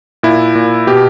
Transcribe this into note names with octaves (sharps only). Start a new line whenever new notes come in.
A#2 E4
A#2
B2 G4